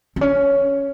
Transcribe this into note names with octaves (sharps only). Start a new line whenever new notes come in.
C4
C#4